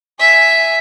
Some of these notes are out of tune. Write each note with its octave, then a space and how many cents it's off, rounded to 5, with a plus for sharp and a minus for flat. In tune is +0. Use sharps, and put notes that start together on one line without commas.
E5 +0 G#5 +0